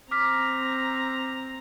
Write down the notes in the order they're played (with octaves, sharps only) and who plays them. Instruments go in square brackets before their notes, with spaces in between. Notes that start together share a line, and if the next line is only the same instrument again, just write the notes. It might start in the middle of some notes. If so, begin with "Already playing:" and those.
[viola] C4 A#5 [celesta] D6 F6 B6